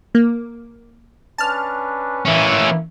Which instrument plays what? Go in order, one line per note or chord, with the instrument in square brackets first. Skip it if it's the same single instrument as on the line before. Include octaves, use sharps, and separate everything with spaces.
[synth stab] A#3
[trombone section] C#4 D4 B4 [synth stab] A5 F6
[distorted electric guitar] E3 C#4 [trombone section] A#3 E4